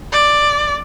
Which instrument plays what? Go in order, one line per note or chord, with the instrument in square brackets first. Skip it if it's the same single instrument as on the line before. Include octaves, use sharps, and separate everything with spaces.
[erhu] D5